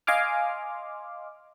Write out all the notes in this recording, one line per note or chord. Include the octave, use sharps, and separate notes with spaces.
D#5 F5 G#5 C6 D6 F6